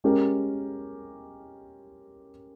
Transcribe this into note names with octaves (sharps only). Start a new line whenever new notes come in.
G#3 C#4 G4 A#4